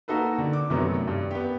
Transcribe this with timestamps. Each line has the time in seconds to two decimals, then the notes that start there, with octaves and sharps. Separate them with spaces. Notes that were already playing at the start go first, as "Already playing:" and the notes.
0.08 A#3 D#4 F#4 A4 B4
0.38 D3
0.53 D6
0.70 F#2 C3 D#3 F#3 A3 B3
1.07 G2
1.31 B3 G4